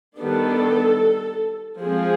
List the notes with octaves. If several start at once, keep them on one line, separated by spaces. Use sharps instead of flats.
D#3 G3 B3 D4 A4
F3 G#3 C4 G#4